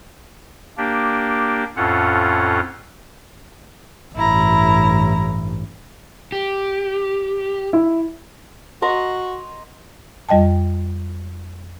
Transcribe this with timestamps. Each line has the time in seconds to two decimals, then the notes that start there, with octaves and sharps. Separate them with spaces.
0.77 A#3 D4 G4
1.77 F2 A2 C#4 F4 A4 F#5
4.15 A1 G2 E4 A#5
6.32 G4
7.73 E4
8.82 F#4 D#5 A#5 C6
10.29 F2 G3 D#5 G5 A5